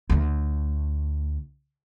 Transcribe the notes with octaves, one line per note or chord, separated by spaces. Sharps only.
D2 A3